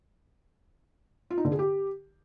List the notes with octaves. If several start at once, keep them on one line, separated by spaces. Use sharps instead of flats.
F4
D#4
D3
G#4
G4